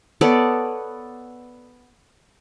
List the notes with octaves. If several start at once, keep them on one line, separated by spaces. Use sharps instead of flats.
B3 A4 C#5 D5